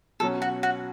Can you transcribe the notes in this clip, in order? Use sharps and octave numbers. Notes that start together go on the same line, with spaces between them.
B2 F#3 C#4 A4
F#4
F#4